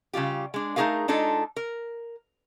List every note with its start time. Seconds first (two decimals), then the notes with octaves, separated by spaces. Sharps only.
0.13 C#3 G3 F4 G4
0.54 G#3 D4
0.76 A3 D#4 G4 G#4 A#4 F5
1.08 G#3 D4 D#4 F4 A4
1.56 A#4